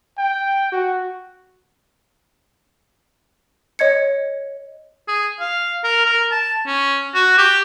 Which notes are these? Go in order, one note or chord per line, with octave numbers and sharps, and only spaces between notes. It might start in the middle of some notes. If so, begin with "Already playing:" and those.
G5
F#4
C#5 D#5 G#6 C#7
G#4
F5
A#4
A#4
A5
C#4
F#4
G4